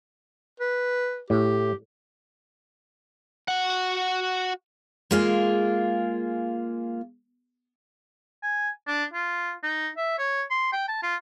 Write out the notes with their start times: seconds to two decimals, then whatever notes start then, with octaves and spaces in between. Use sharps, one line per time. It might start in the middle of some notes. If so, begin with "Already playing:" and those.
0.60 B4
1.30 A2 G4
3.48 F#4 F#5
5.11 G#3 A#3 F4 G#4
8.42 G#5
8.87 D4
9.13 F4
9.63 D#4
9.97 E5
10.18 C#5
10.50 C6
10.72 G5
10.88 A5
11.03 F4